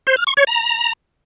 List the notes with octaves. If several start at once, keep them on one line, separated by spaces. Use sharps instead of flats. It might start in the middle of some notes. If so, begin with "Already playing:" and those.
C5
F6
C#6
C#5
A#5